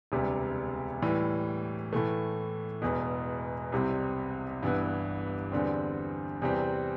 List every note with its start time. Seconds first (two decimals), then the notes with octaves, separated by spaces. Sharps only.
0.12 E1 D2 C3 G3
1.02 A2 E3 G3
1.93 A2 E3 A3
2.82 E1 E2 B2
3.72 C2 C3 G3 C4
4.63 G1 G2 E3 B3 E4
5.52 E2 D3 G3 C4
6.42 E2 C3 G3 C4